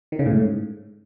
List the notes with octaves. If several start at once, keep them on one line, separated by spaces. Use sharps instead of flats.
D#3
C#3
A2
G#2